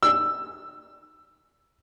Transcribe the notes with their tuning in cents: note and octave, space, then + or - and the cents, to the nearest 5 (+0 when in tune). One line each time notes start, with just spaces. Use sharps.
E6 +10